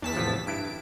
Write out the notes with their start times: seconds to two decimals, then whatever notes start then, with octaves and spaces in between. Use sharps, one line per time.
0.02 E2 A5 B6
0.16 A1 C3 F3
0.47 G2 E4 D7